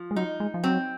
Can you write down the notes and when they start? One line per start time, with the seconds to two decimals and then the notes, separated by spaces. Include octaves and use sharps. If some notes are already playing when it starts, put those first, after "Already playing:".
Already playing: F3
0.11 G#3
0.16 F#3 D#4
0.40 G#3
0.54 F3
0.64 F#3 C4